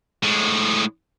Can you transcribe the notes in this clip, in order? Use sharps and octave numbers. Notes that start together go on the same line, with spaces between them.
A2 G#3